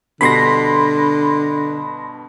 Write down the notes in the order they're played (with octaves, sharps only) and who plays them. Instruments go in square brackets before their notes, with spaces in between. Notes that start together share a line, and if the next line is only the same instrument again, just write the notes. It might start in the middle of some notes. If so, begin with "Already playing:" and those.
[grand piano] G2 B2 [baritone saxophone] D3 [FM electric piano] B5 C6 A#6